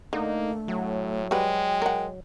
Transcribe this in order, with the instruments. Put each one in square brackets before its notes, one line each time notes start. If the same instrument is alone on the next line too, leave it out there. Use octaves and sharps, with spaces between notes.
[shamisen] D3 [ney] A3 [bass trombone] A#3 [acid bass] D#4
[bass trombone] A2 [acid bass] F#3
[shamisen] G3 F#4 B4 [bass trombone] G#3 [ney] G5
[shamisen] A#4 F#5